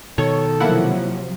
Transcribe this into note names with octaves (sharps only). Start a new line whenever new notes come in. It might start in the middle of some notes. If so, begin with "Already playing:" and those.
B2 D#3 A4 C#5
C3 F3 F#3 A#3 E4 F#5